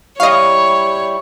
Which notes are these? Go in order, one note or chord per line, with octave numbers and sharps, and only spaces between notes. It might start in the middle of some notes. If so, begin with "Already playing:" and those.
G3 E4 C#5 D#5 F5 C#6